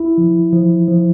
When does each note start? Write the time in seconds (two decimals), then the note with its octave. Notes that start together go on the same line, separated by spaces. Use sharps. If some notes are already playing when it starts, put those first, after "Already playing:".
Already playing: E4
0.18 F3
0.53 F3
0.88 F3